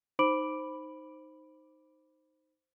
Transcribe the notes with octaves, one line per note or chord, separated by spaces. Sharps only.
D#4 C5 B5 D6 D7 F#7